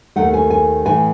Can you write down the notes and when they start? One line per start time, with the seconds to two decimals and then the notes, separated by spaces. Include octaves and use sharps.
0.16 D#2 D#3 A3 F#5
0.34 G#5
0.50 G#5
0.85 A2 E3 A3 G#5